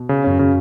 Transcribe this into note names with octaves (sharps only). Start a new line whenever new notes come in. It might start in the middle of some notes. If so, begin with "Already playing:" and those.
Already playing: B2
C#3
F#2 C#4
C#3